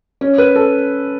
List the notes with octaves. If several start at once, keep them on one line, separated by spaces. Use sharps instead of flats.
C#4
B4
A4